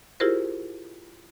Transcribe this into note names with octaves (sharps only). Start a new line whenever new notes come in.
E4 F4 G4 G#4 A#4 C5